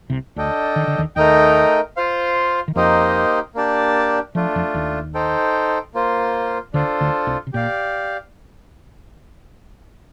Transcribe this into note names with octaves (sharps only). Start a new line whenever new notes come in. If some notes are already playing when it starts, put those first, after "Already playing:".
C2 C3
D2 D3 D4 A4 D#5 G5
D#3
D3
D#2 D#3
D#2 D#3 A3 D#4 A#4 D#5 G5
F4 C5 F5
D#3
F2 F3 A#3 D#4 G4 C5 D#5
A#3 D4 G4 D5 A5
F3 A3 D4 F4
F2 F3
D#2 D#3
D#4 A4 C5 G5
A#3 F4 C5
D2 D3 D4 F4 A4 C5
D2 D3
C2 C3
C3
A#2 G4 D5 F5